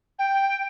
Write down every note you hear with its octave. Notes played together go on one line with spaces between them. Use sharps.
G5